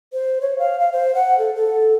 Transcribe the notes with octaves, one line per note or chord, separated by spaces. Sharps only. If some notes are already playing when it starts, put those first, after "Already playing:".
C5
C#5
F5
F5
C5
F#5
A4
A4